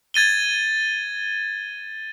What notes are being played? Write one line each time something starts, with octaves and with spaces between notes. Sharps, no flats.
G#6 A6 D#7 G7